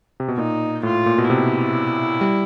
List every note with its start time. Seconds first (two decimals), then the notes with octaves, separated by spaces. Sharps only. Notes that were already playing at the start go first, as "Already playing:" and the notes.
0.20 C3
0.28 B2
0.38 A#2 D#4
0.83 A2 F4
1.06 A#2
1.18 B2
1.29 C3 E4
2.21 G3